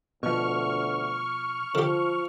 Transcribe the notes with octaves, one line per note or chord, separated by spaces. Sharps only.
D2 B2 F3 C#6 F6
D3 F3 G4